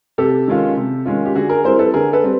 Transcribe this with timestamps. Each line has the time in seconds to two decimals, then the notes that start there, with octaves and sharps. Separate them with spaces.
0.18 C3 G4 A4
0.48 D#3 G#3 C#4 F4
0.77 C3
1.06 D#3 G#3 C#4 F4
1.26 G4
1.35 D3 F#4 G#4
1.49 G#4 A#4
1.64 G3 C4 E4 A#4 C5
1.79 A4 B4
1.94 D3 G#4 A#4
2.13 A4 B4
2.23 G3 C4